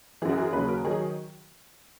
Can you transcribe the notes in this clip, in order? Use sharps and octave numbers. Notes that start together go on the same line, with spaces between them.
F#2 E3 F#4 G#4
G#4
D#2 C#3 F#3 B4
A#4
D#3 F#3 G#4